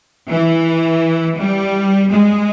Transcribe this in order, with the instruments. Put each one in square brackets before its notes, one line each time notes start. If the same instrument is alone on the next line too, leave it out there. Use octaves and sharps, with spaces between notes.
[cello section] E3
G3
G#3